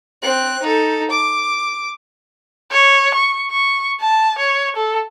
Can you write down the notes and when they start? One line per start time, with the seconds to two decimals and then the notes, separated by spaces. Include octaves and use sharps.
0.22 C4 F#6
0.62 D#4 A4
1.10 D6
2.71 C#5
3.15 C#6
3.50 C#6
4.01 A5
4.38 C#5
4.76 A4